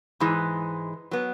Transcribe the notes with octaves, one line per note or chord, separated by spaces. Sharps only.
G#2 E3 G#3
F#3 B3